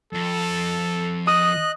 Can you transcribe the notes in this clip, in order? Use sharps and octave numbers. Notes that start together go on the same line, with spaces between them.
F2 A4
D#5 D#6 F#6